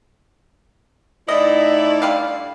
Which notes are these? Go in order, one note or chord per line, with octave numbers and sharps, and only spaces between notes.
A2 D#4 E4 D5 D#5
D3 G3 F5